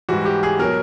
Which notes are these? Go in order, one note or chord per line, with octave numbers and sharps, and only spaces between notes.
G#2 E3 G3 F#4
G4
G#4
B2 F#3 A#4